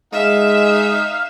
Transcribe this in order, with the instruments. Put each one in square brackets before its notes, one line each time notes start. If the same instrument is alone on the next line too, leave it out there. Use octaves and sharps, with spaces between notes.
[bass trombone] G#3 [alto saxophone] D#4 [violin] E5 [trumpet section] F5